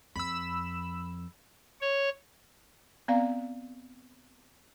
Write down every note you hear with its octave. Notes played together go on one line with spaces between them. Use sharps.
F2 B5 E6
C#5
B3 C4 D5 F5 A#5